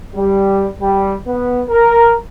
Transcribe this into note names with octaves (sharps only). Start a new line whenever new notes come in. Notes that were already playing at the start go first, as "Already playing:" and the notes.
G3
G3
B3
A#4